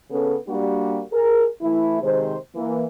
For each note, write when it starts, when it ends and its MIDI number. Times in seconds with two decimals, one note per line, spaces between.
0.10 0.35 49
0.10 0.35 59
0.10 0.35 61
0.10 0.35 69
0.47 1.01 55
0.47 1.01 58
0.47 1.01 62
0.47 1.01 66
0.47 1.01 67
1.12 1.45 68
1.12 1.45 70
1.61 1.99 52
1.61 1.99 57
1.61 1.99 64
2.02 2.35 48
2.02 2.35 51
2.02 2.35 56
2.02 2.35 72
2.55 2.83 52
2.55 2.83 58